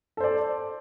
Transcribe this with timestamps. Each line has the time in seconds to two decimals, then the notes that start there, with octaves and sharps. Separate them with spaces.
0.17 A4
0.20 C5
0.24 D5